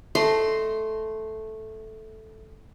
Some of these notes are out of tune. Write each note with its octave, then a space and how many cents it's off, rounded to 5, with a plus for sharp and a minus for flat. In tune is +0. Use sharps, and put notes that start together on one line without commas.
A3 -5 D#5 -10 C6 +0